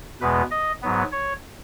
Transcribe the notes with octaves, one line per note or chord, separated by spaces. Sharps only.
E2 B2 G#3 B3 B4
D#5
G#2 F#3 B3
C#5